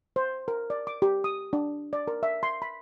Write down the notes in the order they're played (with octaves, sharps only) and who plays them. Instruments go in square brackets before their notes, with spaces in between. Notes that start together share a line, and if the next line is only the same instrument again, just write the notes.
[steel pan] C5
A#4
D5
D6
G4
D#6
D4
D5
A#4
E5
C6
B5